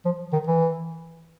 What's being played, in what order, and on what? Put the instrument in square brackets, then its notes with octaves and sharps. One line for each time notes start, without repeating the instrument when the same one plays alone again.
[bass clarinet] F3
D#3
E3